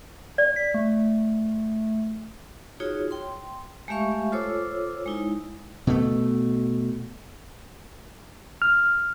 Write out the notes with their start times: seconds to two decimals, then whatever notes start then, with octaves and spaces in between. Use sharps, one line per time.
0.38 D5
0.56 B6
0.74 A3
2.80 D#4 F4 F#4 G#4 C#5
3.11 G5 C6
3.88 G#3 A3 G4 E5 F5 C#6
4.32 F4 A4 C5 C#5 D6 E6
5.06 G#3 D#4 E4
5.87 B2 A3
8.62 F6